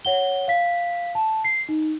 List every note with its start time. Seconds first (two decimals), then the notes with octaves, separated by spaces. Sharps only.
0.05 C#5 F#5 G7
0.48 F5 B6
1.15 A5
1.44 C7
1.69 D#4